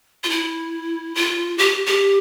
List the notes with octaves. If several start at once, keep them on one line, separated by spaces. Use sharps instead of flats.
F4
E4
F4
G4
G4